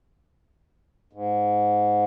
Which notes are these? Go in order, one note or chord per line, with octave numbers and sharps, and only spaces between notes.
G#2